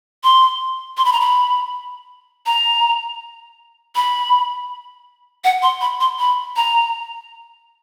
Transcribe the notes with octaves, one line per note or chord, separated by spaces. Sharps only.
C6
C6
B5
A#5
B5
A#5
B5
F#5
C6
B5
C6
B5
A#5